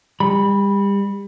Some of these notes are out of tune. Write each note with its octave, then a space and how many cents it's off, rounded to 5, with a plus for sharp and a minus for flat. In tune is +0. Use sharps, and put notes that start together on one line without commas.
G3 +35 B5 -10